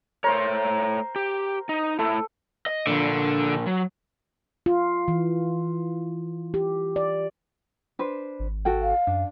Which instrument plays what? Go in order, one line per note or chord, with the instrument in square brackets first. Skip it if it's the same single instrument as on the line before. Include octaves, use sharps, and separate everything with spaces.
[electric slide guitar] A3 C#5 [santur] A#4 C5
[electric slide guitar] G4
D#4
[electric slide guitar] A3 E4 [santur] A4
[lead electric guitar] D#5
[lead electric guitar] A#2 F3 [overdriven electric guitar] D3
[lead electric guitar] F#3
[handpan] F4
E3
G4
D5
[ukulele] D4 B4 C5
[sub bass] G#1
[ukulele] F#4 A4 G5
[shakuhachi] F5
[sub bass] F#2 [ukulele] D4